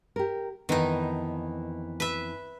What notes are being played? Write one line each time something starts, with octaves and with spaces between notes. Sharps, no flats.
G4 A#4
F2 D#3 E3 B3 D#4
B4 E5